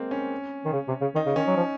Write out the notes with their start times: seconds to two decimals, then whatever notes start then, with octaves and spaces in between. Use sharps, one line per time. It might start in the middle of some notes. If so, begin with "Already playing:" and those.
Already playing: G#3 A#3 C4
0.11 C#4
0.65 D#3
0.73 C#3
0.88 C3
1.01 C#3
1.15 D#3 D#4
1.26 C#3
1.36 D#3 C#4
1.47 F#3
1.57 F3